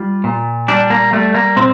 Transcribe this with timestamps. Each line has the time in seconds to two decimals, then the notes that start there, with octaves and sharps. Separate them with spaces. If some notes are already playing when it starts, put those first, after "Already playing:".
Already playing: G3 F4
0.24 A#2
0.68 G3 D4
0.90 A#3
1.13 G3 A3
1.34 A#3
1.57 A#2 C4